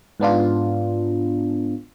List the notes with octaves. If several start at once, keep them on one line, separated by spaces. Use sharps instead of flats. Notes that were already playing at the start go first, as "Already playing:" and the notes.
G#2 B3 D4 F4